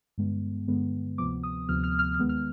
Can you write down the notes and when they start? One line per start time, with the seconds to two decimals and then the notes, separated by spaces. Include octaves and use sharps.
0.18 G2 D3 G#3 B3
0.68 G2 D3 G#3 B3
1.18 D2 C3 F3 B3 D6
1.43 D#6
1.68 D2 C3 F3 B3 F6
1.84 F6
1.99 F6
2.14 F6
2.19 D#2 D#3 G#3 B3
2.29 F6